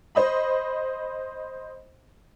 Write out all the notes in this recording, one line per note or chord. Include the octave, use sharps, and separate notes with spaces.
C5 D#5 B5